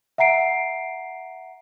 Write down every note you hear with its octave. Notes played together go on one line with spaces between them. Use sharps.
E5 F#5 A#5 C7 D7